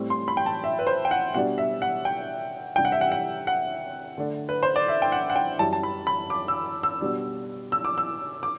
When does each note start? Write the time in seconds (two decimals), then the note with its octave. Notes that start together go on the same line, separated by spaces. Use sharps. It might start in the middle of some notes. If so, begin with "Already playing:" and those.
Already playing: A2 G3 C4
0.10 C6
0.28 B5
0.37 G5
0.46 A5
0.64 E5
0.79 B4
0.87 C5
1.05 G5
1.11 F#5
1.34 B2 G3 D4 F#5
1.58 E5
1.82 F#5
2.05 G5
2.76 C3 G3 D4 G5
2.85 F#5
2.92 E5
3.01 F#5
3.12 F#5
3.47 F#5
4.18 D3 A3 D4
4.49 B4
4.63 C5
4.76 D5
4.88 E5
5.02 G5
5.12 F#5
5.30 F#5
5.36 G5
5.59 F#2 E3 G3 A5
5.73 A5
5.83 B5
6.07 B5
6.30 D6
6.48 E6
6.83 E6
7.01 B2 G3 D4
7.72 E6
7.85 D6
7.98 E6
8.43 D6